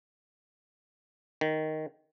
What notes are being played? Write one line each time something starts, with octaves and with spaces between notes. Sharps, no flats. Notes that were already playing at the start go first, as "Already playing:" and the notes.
D#3